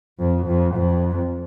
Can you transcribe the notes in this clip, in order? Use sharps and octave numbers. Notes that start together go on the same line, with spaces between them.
F2
F2
F2